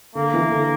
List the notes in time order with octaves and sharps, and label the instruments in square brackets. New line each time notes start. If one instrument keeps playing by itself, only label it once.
[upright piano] D3 [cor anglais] A#3
[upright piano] E3
D3